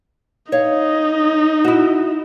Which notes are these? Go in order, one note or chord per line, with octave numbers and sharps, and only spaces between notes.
D#4 C#5 F5
E4 F#4